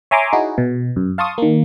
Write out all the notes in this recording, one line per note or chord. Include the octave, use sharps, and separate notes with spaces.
C#5 E5 G#5 A#5 C6 D6
D#4 E4 F#4 G#4
B2
F#2
F5 A5 C6 C#6 D#6
D#3 A#3